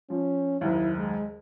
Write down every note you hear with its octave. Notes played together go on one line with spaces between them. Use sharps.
F3 C#4
F#1 D#2 E4
G#3